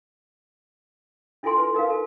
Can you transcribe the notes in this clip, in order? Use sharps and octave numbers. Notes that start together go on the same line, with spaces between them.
D4 E4 F4 A4 G#5 C6
B4
D#4 A#4 B4 F5
A4